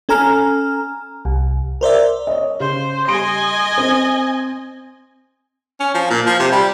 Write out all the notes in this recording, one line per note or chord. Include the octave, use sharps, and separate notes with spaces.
C#4 A4 G#5 A#5 F6
C2
A#4 C5 D5 E5
C#5 D#5
C#3 C5
G3 D#5 G#5 C6 D7
C4 C5
C#4
F3
A#2
F3
C3
G3